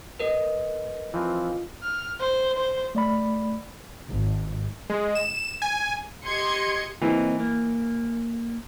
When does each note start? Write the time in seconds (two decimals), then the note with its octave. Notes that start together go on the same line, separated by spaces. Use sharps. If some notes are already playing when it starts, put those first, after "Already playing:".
0.19 A#4 B4 D#5
1.14 E3 F3 C4 F4
1.83 F6
2.20 C5
2.58 C5
2.95 A3 D5 B5
4.08 G#1
4.90 G#3
5.15 E7
5.62 G#5
6.25 G4 D#5 C6 G#6 C#7
7.02 E3 A#3 C4 D#4
7.40 A#3